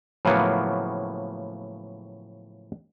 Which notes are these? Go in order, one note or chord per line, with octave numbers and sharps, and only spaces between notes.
A2 C#3 F3 F#3 A#3 B3